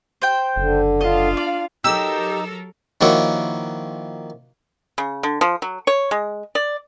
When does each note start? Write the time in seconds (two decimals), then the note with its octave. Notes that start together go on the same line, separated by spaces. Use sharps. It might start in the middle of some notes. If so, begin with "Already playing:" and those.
0.22 C5 G5
0.56 F#1 D3
1.01 D4 F4 D#5 F5
1.37 D5
1.84 F#3 D#4 G4 A4 A#4 E6
3.01 D#3 F3 A#3 E4 F#4 C#5
4.98 C#3
5.23 D3
5.41 F3
5.62 F#3
5.87 C#5
6.11 G#3
6.55 D5